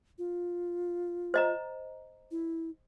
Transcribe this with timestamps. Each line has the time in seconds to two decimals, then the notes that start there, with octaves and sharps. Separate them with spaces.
0.18 F4
1.34 C5 D#5 A#5
2.31 E4